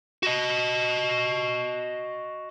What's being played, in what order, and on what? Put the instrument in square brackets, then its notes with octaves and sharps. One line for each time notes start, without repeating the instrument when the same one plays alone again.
[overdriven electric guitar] F#4 D#5